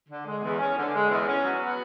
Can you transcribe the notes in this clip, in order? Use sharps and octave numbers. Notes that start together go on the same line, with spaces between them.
D3
G#3
E2
C#4
D3
G#3
E2
C#4
F#3
B3